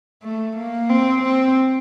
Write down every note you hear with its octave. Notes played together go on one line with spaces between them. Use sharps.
A3
A#3
C4
C4